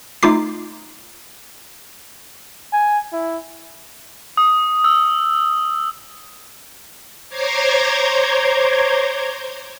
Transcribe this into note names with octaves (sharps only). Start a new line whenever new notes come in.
A3 D#4 F4 D6 C7
G#5
E4
D#6
E6
C5 C#5 A#5 C6 D6 G#6